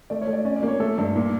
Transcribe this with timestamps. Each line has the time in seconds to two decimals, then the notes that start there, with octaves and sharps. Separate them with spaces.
0.10 A3 D5
0.21 C#5
0.27 A3
0.33 D5
0.45 C#4 D5
0.56 D5
0.63 A#3
0.68 C#5
0.80 A3 A4
0.98 G2
1.15 A#2